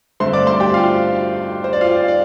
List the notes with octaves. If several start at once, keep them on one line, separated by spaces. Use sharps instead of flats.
G2 D3 A3 C4 C5 C6
D5 D6
C5 C6
G4 G5
F4 F5
C5
D5
F4 F5
D5